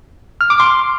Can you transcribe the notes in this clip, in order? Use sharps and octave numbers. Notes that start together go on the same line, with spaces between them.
F6
D6
C6